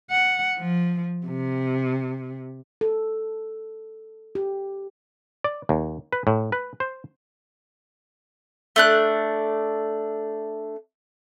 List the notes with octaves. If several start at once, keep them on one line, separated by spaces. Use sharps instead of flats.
F#5
F3
C3
A4
G4
D5
D#2
B4
A2
B4
C5
A3 D4 F#6